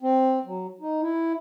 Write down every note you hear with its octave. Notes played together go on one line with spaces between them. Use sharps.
C4
F#3
D#4
E4